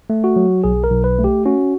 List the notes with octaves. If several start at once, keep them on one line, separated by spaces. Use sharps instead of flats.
A3
F#4
F#3
B1 G#4
A#4
B1
B4
A3
G4
C#4 F#4